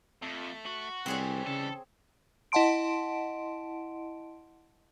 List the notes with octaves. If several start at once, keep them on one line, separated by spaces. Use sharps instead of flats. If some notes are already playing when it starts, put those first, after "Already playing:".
F2 A3
F#4
C2 E3 G3 C4 G#4 C#5
C#3 A4
E4 D#5 F#5 A5 C6 D7